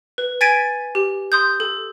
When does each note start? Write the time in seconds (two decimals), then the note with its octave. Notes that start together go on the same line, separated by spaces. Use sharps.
0.18 B4
0.41 G#5 G#6 A6 B6 D7 D#7
0.95 G4
1.32 C6 D#6 G6
1.60 A4